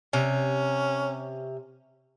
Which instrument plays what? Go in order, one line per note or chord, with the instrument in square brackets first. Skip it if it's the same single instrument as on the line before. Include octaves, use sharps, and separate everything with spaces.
[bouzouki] C3 [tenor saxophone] C#4